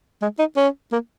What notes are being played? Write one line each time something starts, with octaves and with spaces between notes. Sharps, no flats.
G#3
D#4
C#4
A#3